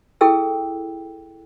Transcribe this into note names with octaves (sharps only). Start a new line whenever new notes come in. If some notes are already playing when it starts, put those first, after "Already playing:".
E4 G#4 A4 G5 E6